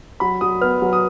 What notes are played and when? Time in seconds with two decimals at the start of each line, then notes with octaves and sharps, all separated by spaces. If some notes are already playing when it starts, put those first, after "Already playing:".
0.20 F#3 B5
0.41 F#3 D#6
0.61 B3 F6
0.82 F#3
0.93 D#6